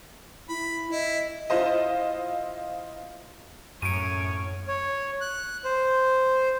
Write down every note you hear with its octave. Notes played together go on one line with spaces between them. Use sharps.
E4 B5
E4 D#5
E4 F4 C5 D#5
F#2 A2 C#4 C#5 D7 D#7
C#5
F#6
C5